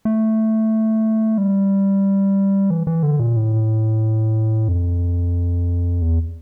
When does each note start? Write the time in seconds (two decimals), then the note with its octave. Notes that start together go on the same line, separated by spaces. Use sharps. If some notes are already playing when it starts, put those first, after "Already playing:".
0.05 A3
1.38 G3
2.70 E3
2.87 E3
3.03 D3
3.19 A#2
3.37 A2
4.68 F2
6.02 E2